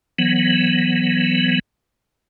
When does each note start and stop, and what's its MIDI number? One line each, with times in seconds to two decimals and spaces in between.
0.19 1.59 52
0.19 1.59 54
0.19 1.59 59